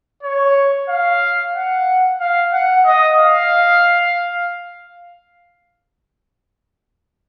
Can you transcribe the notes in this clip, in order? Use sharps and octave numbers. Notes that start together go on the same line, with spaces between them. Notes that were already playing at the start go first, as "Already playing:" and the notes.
C#5
F5
F#5
F5
F#5
D#5
F5